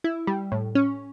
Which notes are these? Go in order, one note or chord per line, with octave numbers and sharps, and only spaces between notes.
E4
G3
A2
C#4